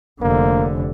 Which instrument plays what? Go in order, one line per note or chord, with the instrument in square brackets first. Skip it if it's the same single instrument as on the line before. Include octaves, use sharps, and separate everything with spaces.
[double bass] F1 D3 [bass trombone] A#3